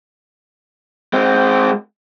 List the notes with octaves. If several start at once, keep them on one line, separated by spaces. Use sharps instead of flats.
G#3 C4